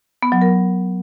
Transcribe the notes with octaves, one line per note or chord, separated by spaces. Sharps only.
B3
F#3
A#4